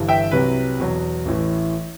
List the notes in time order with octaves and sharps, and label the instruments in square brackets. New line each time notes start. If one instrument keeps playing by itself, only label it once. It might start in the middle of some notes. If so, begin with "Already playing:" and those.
Already playing: [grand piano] G1 G2 E3
E5 G5
C2 C3 F#3 B4
E2 B2 F#3
A1 A2 E3